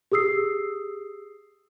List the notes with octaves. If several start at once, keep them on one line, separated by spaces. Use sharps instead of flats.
G4 G#4 D#6 E6 C7